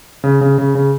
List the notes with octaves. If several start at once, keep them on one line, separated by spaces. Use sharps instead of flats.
C#3
C#3
C#3
C#3